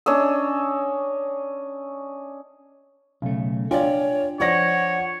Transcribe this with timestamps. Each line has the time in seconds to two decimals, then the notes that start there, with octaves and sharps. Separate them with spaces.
0.06 C#4 D4 D#5 E6
3.22 B1 C#3 A3
3.71 D4 F4 C#5 D5 G5 G#5
4.40 F3 C#5 D5 F#5 A#6